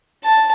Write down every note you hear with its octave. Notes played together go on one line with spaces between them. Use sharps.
A5